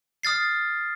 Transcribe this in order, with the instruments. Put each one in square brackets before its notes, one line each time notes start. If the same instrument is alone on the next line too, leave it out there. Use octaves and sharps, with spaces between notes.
[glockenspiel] D#6 F6 A6 C7